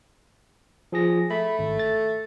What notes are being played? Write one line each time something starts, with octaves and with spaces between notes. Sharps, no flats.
F3 G#4 A#6
A3 B5
G#1
A6